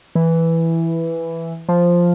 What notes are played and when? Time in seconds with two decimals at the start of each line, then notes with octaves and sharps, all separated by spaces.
0.15 E3
1.69 F3